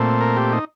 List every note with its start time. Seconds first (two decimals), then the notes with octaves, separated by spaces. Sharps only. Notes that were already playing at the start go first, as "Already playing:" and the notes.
Already playing: A#2 A3 C4
0.21 A#4
0.36 G4
0.53 D#4